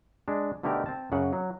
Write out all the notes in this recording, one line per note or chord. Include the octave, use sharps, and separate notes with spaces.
G#3 D4
B2 D3 A3 D#4 G4 A#4
C4 A5
F#2 C#3 F#5
F#3